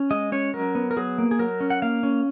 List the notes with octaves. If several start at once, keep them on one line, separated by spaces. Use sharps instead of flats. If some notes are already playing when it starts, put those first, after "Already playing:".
Already playing: C#4
G#3 D#5
C#4 C#5
F#3 A#4
B3
A#4
F#3 G#4
A#3
G#4
F#3 A#4
C#4
F#5
A#3 F5
C#4